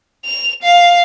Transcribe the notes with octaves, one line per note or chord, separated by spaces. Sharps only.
F7
F5